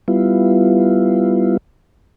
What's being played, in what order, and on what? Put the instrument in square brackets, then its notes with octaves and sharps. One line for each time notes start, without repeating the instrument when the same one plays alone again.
[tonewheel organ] G3 B3 E4 F4